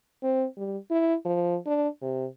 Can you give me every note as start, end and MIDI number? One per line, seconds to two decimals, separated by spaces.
0.23 0.47 60
0.57 0.77 55
0.91 1.15 64
1.25 1.57 53
1.66 1.88 62
2.02 2.26 48